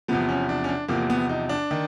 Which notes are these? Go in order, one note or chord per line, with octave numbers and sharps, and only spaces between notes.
E2 C3 F3 B3
C#4
D4
C#4
D4
E2 C3 F3 A#3
B3
D#4
D4
D#3